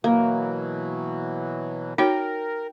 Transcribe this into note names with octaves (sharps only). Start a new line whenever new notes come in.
B2 E3 F#3 A#3
D#4 F#4 A#4 C#5 G5